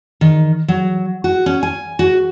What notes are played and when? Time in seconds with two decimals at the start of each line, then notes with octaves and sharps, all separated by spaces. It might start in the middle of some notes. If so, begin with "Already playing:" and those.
0.21 D#3
0.68 F#3
1.24 F#4
1.46 C#4
1.63 G#5
1.99 F#4